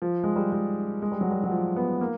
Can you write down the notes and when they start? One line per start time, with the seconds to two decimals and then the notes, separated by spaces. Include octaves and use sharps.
0.02 F3
0.23 G#3
0.36 G3
0.52 G#3
1.02 G#3
1.12 G3
1.21 F#3
1.31 G3
1.44 F#3
1.51 F3
1.76 B3
2.01 A#3